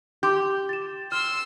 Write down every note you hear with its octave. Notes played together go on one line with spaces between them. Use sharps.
G4 C6 D6 G6
A6 E7
C6 E6 F6